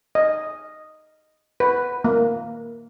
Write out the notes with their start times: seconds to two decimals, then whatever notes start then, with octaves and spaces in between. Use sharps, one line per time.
0.15 D#5
1.60 B4
2.04 A#3